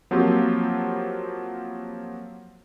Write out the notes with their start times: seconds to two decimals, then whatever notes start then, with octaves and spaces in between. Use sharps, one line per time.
0.11 F3 F#3 A#3 C4 F4 G4